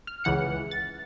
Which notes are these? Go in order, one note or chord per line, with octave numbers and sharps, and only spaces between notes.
F6
C#2 C#3 E3 F#5 C#7
A6